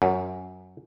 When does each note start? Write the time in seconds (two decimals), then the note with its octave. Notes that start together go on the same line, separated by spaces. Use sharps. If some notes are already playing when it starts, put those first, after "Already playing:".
0.02 F#2